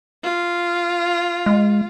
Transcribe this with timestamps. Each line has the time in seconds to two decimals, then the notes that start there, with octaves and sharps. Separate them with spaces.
0.23 F4
1.46 G#3